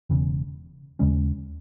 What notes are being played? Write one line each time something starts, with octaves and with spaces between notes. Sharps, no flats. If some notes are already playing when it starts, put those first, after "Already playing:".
E1 E2 C#3
D#2 C#3 G#3 C#4